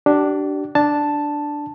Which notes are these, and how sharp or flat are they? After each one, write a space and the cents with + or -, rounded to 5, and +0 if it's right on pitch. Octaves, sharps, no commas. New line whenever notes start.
D4 +0 G4 -35
D4 +0 A5 +0